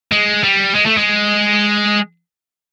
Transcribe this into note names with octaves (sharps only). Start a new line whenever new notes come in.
G#3
G3
G#3
A3
G#3